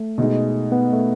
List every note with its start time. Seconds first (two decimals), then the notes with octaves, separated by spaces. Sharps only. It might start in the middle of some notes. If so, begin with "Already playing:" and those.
Already playing: A3
0.18 B2 G#3 D#4
0.72 B3
0.93 A3